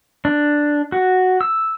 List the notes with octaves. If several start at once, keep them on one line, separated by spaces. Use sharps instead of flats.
D4
F#4
E6